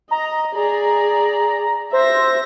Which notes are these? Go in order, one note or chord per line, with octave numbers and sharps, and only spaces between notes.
D#5 A#5
G#4 D5 A#5
C5 E5 A#6